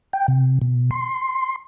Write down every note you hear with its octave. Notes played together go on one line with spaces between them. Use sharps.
G5
C3
B2
C6